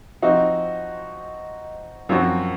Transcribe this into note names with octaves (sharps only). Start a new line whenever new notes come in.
F3 C4 D#4 F#4
F#2 F3 C4 F#4